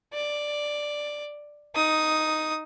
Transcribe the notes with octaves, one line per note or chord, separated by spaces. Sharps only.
D5
D#4 D#6